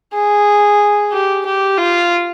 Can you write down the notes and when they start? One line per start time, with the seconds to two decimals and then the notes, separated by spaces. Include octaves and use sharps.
0.14 G#4
1.12 G4
1.46 G4
1.78 F4